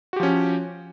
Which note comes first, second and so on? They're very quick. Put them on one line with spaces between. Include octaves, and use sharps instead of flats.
F#4 G4 F3 C#4